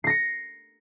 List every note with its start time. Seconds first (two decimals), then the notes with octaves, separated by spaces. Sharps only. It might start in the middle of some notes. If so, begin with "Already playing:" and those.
0.04 C7
0.07 A#6
0.10 C#7